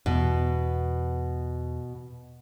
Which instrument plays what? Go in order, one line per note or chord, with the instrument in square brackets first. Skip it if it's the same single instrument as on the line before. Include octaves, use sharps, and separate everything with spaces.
[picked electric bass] E2 [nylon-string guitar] B2